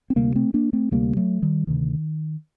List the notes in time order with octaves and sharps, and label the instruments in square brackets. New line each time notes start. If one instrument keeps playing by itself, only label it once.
[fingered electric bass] C4
D2 C3 G3 A#3
A3 C4
A#3 D4
A3 C4
D2 C3 G3 A#3
F#3 A3
D#3 G3
D2 C3 D#3